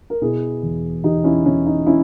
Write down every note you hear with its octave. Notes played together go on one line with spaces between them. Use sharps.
A#4
B2 E4 G#4
E2
E2 D#4 G4
C#4 E4
E2 C#4
D#4
C#4 E4